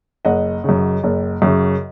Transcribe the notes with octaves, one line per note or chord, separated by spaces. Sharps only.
F#1 D#5 F#5
F#2 C#3
F#1
F#2 C#3